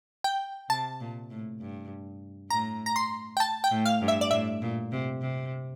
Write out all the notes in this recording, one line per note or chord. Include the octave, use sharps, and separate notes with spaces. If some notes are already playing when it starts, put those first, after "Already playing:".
G5
C3 A5
A#2
A2
G2
A2 A#5
A#5
C6
G5
A5
G5
A2
F5
G2
E5
D5
A2 E5
A#2
C3
C3